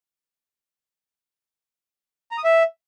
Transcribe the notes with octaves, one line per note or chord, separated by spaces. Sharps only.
A#5
D#6
E5